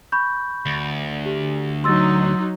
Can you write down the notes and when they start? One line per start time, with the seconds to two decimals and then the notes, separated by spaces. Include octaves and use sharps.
0.12 B5 C#6 G6
0.66 D2
1.26 G4
1.84 F#3 D#4 C6 E6 A6